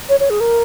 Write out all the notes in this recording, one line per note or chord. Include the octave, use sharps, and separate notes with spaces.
C#5
C#5
G#4
A#4